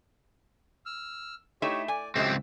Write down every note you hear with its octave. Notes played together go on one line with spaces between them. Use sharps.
E6 F6
A3 D#4 E4 G4 C#5
D5 G#5
C#2 F#3 G#3 A3 C4 G4 E6